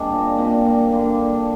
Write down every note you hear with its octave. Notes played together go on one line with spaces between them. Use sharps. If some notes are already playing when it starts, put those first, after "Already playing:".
Already playing: G3 G#3 A#3 C4 D4
A#2
A#2 C4
A#2
D3 A#3
D3